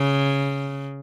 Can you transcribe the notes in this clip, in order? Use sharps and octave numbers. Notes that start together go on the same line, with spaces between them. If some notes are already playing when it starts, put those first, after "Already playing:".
Already playing: C#3